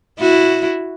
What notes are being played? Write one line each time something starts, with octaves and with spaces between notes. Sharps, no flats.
E4 F#4